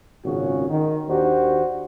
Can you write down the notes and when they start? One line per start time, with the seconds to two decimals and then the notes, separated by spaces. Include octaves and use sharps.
0.24 G#1 A#2 C#3 C#4 F#4
0.70 D#3
1.08 D#2 D4 F#4 G4 C5